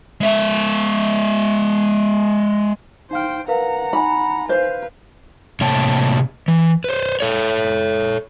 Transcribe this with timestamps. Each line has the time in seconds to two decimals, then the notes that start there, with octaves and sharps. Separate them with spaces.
0.21 G#3 E5
3.11 D#4 C5 F5 G5 F6
3.48 A#4 B4 F5 F#5 A#5
3.93 D#4 G#5 B5
4.49 B4 C5 F5
5.61 A2 C3 A#3 C#5 G5 A5
6.48 E3
6.84 B4 C5
7.21 A4 C#5